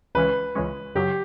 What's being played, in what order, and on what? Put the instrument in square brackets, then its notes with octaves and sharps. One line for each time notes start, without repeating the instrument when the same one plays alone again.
[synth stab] C#2 C#3 E3 G#3 C#4 [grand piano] B4
[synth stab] C#2 C#3 E3 G#3 C#4
[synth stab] F#2 C#3 F#3 [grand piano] G4